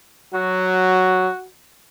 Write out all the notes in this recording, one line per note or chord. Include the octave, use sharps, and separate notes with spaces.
F#3 F#4